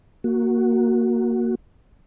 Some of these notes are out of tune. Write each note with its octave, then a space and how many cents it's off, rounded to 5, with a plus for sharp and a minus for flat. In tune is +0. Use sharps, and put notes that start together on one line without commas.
A#3 +0 F#4 +0